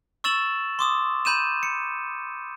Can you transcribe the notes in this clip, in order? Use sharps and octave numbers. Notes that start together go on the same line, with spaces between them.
C#6 E6 A6 E7 F#7
C6 D6 D#6
B5 G6 D#7 E7
C#7